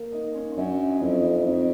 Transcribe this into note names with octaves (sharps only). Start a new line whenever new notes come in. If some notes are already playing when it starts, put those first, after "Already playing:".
Already playing: A#3 A#4
D#4 D#5
C#4 C#5
C#5
F#2 D4 D5
D#5
F2 E4 E5
D#4 D#5
E4 E5
E4 E5
F2 D#4 D#5